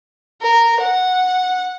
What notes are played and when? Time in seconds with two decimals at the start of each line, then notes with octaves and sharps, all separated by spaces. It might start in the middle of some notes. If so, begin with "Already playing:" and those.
0.41 A#4
0.80 F#5